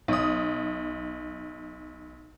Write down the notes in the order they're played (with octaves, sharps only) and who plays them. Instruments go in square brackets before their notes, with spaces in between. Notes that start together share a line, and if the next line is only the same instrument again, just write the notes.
[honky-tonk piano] B1 D#6